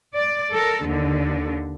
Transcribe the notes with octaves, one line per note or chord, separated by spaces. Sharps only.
D5
A4 A#4
D#2 D3